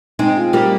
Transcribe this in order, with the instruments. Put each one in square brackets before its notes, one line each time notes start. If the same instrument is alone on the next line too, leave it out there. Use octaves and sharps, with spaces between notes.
[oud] G#3 C4 [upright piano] D#4
[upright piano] F4
[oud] G3 A#3 [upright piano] G4